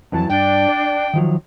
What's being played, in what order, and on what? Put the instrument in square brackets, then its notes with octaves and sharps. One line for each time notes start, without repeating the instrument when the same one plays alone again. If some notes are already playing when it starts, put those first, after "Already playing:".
[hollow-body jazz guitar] F2 E3 F#3 [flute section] A5
[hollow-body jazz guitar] G2 [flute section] D4 [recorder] G5
[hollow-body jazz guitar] D5
D#3 F3 F#3